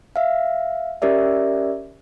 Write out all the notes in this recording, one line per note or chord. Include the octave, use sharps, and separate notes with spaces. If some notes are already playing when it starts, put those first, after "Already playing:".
E5 F5
C#4 G4 A#4 D5 E5